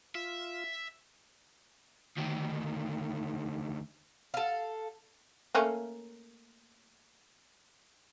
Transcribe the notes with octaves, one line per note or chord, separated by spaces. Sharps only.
F4 E5
D2 D#3
A4 F5
A3 A#3 C#4